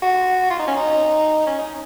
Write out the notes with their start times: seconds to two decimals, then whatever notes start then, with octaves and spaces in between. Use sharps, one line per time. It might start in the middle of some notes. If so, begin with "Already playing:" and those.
0.02 F#4
0.50 F4
0.59 D#4
0.68 C#4
0.77 D#4
1.47 C#4
1.59 D#4